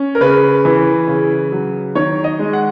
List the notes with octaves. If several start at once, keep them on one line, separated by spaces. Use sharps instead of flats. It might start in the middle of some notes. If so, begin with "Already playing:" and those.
Already playing: C#4
A#4
C#3 B4
E3
C#3
F#3
D#3 C#5
D#5
G#3
F#5